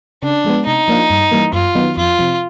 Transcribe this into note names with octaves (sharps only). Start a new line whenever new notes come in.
C#3 D4
F3 G#3 B3
C3 D#4
F3 A#3 D4 F4
G2
E3 G3 A#3
F#2 F4
D#3 F#3 B3 D#4
F2 F4
C3 F3